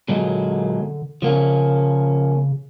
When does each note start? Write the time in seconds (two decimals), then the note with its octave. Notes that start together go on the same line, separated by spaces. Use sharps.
0.08 A#2 D3 F#3 G#3
1.22 C#3 F3 A#3 C#4